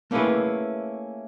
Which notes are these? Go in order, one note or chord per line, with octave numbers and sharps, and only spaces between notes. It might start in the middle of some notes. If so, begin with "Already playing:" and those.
A3 A#3 C#4 E4 G#4 B4